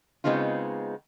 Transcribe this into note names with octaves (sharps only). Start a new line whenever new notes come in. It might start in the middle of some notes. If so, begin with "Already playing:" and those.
C#3 G#3 B3 C4 D#4 F4